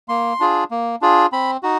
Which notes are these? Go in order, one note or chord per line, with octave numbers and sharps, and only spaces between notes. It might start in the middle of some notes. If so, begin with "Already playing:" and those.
A#3 C6
D4 F4 G#4
A#3
D4 F4 G#4
C4 B5
D#4 F#4